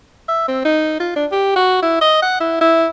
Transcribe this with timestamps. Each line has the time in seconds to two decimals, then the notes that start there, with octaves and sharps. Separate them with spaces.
0.28 E5
0.48 C4
0.65 D#4
1.00 F4
1.16 D4
1.32 G4
1.56 F#4
1.82 E4
2.01 D#5
2.22 F#5
2.40 E4
2.61 E4